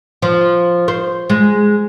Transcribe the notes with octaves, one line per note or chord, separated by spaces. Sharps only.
F3
C5
G#3